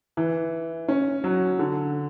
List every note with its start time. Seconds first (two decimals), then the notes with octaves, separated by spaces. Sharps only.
0.17 E3
0.88 C#4
1.24 F#3
1.59 D3